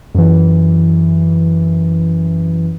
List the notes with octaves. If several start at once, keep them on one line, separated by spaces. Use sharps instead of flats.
F#2 E3